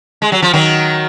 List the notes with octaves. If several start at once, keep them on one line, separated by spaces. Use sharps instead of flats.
G#3
F#3
F3
D#3 F#3